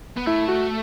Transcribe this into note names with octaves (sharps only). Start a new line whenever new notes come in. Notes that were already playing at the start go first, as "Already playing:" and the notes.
B3
A3 E4
F#4